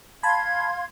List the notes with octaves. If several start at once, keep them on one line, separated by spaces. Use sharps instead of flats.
F5 A5 B5 C6 G#6